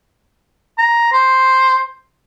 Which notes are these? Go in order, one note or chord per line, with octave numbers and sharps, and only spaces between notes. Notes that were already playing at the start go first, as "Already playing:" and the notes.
A#5
C5